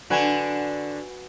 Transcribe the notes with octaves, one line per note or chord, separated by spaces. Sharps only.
D3 D4 F#4 B4 G#5